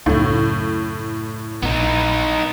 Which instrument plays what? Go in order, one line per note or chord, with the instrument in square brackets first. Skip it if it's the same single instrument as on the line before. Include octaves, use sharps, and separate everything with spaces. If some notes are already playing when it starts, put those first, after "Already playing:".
[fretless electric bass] C#2 F#2 [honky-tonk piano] A2
[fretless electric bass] A#1 [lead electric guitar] B3 D#4